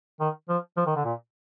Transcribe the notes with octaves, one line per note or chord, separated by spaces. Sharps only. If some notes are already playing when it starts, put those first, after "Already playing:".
D#3
F3
F3
D#3
D3
A#2